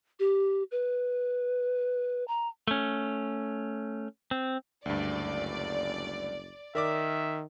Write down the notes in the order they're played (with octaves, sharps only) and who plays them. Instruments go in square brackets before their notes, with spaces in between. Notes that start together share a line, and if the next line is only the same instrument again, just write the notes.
[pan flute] G4
B4
A#5
[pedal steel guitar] A3 C#4
C4
[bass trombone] F#1 [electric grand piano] D2 G2 [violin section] D5
[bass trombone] D#3 [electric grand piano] A#4 D5 D6 [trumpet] E5